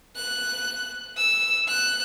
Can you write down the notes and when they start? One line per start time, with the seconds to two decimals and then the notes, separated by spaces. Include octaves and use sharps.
0.16 F#6
1.17 E6
1.67 F#6